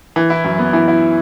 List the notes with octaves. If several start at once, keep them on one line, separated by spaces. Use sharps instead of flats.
E3
E4
F#2
B3
E3
E4